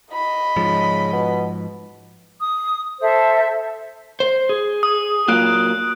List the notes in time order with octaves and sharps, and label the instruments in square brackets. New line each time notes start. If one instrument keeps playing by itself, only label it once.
[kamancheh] D#5 B5
[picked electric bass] G#2 F3 [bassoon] C#3
[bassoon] B2
[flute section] D#6
A4 C5 E5
[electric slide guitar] C5
G#4
[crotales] D#6
[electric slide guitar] F#3 A#3 F4 [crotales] F#6 D7